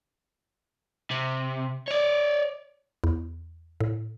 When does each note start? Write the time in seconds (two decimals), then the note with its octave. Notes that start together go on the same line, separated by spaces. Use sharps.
1.11 C3
1.88 C#5 D5
3.04 E2
3.80 A2